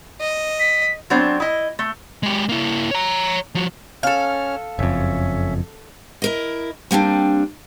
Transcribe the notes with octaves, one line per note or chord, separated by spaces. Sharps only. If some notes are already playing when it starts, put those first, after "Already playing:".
D#5
B6
F#3 B3 C4 D4 C5
E4 D#5
A3
G#3 G4
A#3 E4
C#5 A#5
F3 F#4
C#4 A4 F5 F6
F#1 F2 C#4 E5
E4 A#4 D#5
G3 A#3 C4 D4